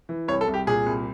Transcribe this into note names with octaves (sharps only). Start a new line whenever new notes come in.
E3
C2 C#5
A4
C2
G4
A#2 G#4
C2